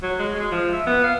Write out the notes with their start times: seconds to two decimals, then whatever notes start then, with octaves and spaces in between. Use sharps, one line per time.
0.02 F#3
0.19 G#3
0.35 G#3
0.52 F3
0.73 E5
0.86 B3
1.04 F5